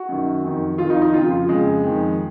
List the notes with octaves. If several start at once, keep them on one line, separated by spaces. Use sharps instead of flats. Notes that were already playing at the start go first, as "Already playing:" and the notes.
Already playing: F#4
F#2 D#3
F2 D#3
F2 D#3 F4
D#4
D#4
F2 C#3 F4
F4
F2 C#3 G#3
F2 D#3